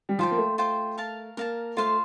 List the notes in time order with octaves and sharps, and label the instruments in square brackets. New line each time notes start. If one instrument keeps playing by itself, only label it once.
[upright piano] G3
[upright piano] F3 [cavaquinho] F4 C5 G5
[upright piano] A#3
A3
[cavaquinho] F4 C5 G5
A#4 F5 A5
[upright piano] A#3 [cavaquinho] A#4 F5 A5
[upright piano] A3 [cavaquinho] F4 C5 F5